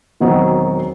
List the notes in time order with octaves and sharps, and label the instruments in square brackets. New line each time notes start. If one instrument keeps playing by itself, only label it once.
[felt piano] E1 D#3 F#3 B3 C4 D#5